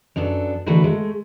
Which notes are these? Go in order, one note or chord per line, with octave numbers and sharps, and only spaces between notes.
F#2 B3 D4 A4
D3 E3 A3 F#4 A#4 B4
G#3 A3